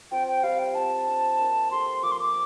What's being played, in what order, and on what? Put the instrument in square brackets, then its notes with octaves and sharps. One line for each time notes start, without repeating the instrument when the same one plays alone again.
[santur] C4 F4 C5 [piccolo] G5
[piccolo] G5
[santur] G3 C4 F4 C5 [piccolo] F5
[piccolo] G5
[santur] C4 F4 C5 [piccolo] A5
[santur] D4 F4 C5
A#3 D4 F4 C5
[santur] A3 D4 G4 [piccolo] C6
[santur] F3 A#3 F4 [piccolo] D6
[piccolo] C6
D6